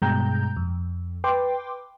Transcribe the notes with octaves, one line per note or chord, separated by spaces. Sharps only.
G2 B2 G#3 G5 A#5 G6
F2
B4 G5 C6 D6